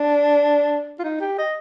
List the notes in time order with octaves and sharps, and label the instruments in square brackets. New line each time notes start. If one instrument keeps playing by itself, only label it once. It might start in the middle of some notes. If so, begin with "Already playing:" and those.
Already playing: [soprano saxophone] D4
F4
D#4
G4
D#5